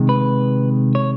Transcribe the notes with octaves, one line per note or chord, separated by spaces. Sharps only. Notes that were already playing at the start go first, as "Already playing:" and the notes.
Already playing: C3 D#3 G#3
B4
C#5